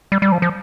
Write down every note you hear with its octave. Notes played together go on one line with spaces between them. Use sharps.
G3
G3
F3
F3